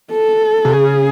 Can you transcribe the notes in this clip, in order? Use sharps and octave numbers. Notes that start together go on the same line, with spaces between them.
A4
C3
C#3 G#4